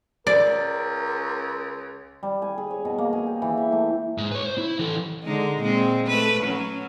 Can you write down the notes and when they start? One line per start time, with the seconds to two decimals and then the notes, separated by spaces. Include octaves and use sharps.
0.27 C#2 A#4 D5
2.23 G3
2.42 G#5
2.58 G#4
2.71 C#5
2.85 B2
2.98 A#3
3.13 G#4
3.27 G4
3.42 E3
3.57 E5
3.72 A3
4.18 G#2
4.32 B4 C#5
4.44 C5
4.58 E4
4.79 E3 A4
5.24 D3 G#3 D#4
5.61 A#2 G#3 C4
6.07 A3 B4
6.43 F#3 C#4